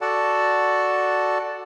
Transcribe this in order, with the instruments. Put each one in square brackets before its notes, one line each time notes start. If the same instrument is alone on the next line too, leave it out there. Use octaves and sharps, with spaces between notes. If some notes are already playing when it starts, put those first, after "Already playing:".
[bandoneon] F#4 A4 D5 F#5 A5